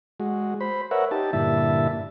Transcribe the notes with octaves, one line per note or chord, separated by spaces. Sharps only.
G#3 F#4
C5 B5
A#4 B4 C#5 E5 F#5
D#4 G4 A5
G2 A#2 D3 E4 E5 A5